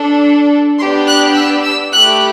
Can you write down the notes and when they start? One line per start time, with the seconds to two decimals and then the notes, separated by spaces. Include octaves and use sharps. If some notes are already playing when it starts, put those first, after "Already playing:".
Already playing: D4 A4
0.79 B3 D4 G4 C6
1.07 F#6
1.36 E6
1.64 E6
1.92 A3 E4 G4 F#6